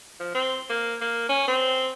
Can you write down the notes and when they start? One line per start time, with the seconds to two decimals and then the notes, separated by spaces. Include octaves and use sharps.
0.20 F3
0.35 C4
0.70 A#3
1.01 A#3
1.29 C#4
1.48 C4